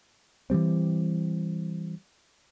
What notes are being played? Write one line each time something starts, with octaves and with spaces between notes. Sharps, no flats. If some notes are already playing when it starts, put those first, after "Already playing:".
E3 F#3 G3 C4